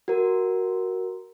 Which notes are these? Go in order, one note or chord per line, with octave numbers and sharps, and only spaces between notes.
F#4 A#4